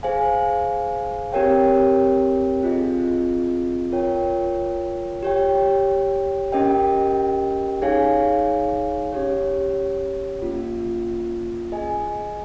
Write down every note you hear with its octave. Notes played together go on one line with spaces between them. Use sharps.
G#4 C5 F5 G#5
C4 G4 A#4 C#5 G5
C4 F4 G#4 D#5
F4 A#4 C#5 G5
G4 C#5 G5
C#4 G4 A#4 D#5 G5
D#4 G#4 C#5 F5 G#5
C#4 G4 C#5
A#3 C#4 F4
G#4 D#5 G#5